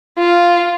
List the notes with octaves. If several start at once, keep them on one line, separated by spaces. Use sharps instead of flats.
F4